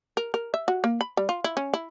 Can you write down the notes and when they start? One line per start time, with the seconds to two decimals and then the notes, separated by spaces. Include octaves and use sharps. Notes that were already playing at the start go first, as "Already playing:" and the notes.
0.17 A#4
0.34 A#4
0.54 E5
0.68 F#4
0.84 A#3
1.01 B5
1.17 G3
1.29 F4
1.44 E4
1.57 C#4
1.74 E4